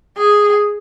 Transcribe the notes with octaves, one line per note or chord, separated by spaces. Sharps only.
G#4